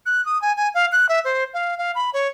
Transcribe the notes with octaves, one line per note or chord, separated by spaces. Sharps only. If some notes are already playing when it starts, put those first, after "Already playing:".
F#6
D#6
G#5
G#5
F5
F#6
E5
C5
F5
F5
B5
C#5